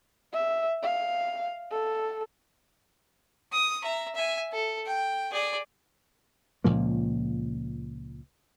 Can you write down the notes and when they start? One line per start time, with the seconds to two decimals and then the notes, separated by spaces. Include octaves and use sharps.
0.33 E5
0.82 F5
1.72 A4
3.52 D#6
3.83 E5 A#5
4.15 E5 G#5
4.52 A4
4.86 G5
5.32 G#4 D5
6.64 C#2 A#2 F3 A#3